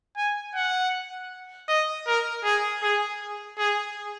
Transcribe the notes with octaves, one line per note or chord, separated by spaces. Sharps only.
G#5
F#5
D#5
A#4
G#4
G#4
G#4